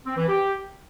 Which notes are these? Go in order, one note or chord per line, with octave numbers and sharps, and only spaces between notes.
C4
E3
G4